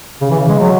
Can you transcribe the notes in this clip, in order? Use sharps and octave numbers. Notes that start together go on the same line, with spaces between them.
C#3
E3
C#3
G#3
F#3